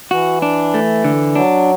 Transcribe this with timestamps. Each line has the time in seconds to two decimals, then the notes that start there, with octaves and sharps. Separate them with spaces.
0.11 E3 F#4
0.42 D4
0.74 A3
1.05 D3
1.35 F#3 D4